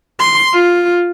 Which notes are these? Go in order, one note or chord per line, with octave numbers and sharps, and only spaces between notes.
C6
F4